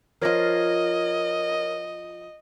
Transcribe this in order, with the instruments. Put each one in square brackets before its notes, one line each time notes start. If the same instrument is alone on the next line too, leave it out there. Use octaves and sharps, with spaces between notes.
[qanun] F3 F4 [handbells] A#4 C#5 A#6 [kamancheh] D#5